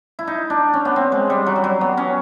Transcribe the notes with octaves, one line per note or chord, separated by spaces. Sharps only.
E4
D#4
D4
C#4
B3
C4
G#3
G3
F#3
G3
F#3
B3
C#4